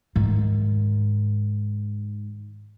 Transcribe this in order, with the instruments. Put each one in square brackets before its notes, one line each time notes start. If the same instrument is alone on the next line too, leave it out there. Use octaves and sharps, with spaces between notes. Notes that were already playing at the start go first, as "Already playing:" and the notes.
[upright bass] G#2 D#3